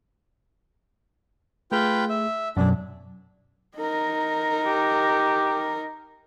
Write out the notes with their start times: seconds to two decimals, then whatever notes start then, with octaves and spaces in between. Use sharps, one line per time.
1.72 A3 F4 G#4 B4 G5
2.09 E5
2.57 F#2 B2 F#3 D4
3.77 D#4 A#4
4.65 G4